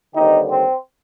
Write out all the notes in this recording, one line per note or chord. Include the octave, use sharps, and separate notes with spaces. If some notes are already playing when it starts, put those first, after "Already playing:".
D#2 D3 G3 C4 D#4 G4
C4